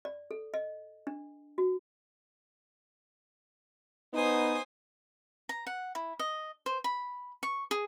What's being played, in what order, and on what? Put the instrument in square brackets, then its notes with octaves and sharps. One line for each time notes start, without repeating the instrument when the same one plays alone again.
[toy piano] D5
A4
D#5
D4
F#4
[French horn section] B3 D#4 [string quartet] C5 G#5 D#6
[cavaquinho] A#5
F#5
E4
D#5
C5
B5
C#6
G#4